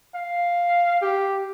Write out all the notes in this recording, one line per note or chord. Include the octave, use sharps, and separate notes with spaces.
F5
G4